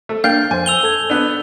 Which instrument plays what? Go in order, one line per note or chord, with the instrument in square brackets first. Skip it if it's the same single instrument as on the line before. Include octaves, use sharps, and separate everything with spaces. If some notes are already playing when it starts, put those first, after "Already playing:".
[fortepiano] A3
[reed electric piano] A#3 D4 A6 [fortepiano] F5 G5 [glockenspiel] G6
[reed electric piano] F2 C5 [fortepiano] G#5
[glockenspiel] E6 F7 G7
[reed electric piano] A4 G#6
[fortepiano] B3 D4